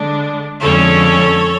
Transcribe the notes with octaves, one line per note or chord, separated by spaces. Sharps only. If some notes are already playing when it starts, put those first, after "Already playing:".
Already playing: D3 G#3 D4
F2 D3 G#3 C#4 A4 C#5